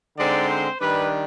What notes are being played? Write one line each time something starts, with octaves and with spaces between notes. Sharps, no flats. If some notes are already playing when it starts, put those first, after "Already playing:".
D3 G#3 C4 D#4 D5
C5
D#3 G3 D4 B4